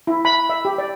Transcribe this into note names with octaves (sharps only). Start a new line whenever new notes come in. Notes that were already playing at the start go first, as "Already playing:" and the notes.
E4
B5
E5
G4
D5